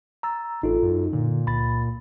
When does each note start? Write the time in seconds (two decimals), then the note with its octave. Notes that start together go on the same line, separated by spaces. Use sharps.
0.23 A#5 E6 A6
0.63 A1 D#4 F4 A4
0.83 F#2
1.13 A#2 D3
1.47 C#2 B5 A6